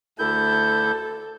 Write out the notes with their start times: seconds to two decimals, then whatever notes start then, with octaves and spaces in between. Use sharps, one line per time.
0.19 D2 E4 A4 G6